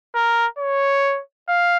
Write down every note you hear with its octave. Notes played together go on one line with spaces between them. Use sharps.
A#4
C#5
F5